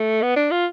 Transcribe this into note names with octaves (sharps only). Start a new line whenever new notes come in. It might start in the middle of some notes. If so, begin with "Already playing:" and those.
Already playing: A3
B3
D4
F4